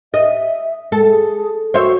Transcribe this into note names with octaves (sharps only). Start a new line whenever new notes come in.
D#5 E5
G#3 A4
G#4
F#4 C5 C#5 E5